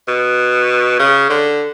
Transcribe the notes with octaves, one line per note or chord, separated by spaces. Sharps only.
B2
C#3
D3